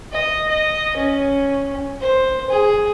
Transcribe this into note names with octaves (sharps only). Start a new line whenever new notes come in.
D#5
D#5
C#4
C5
G#4